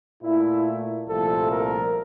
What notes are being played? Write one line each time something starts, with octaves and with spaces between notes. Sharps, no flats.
A#2 A3 E4
C2 A#2 F3 A3 A4
A#4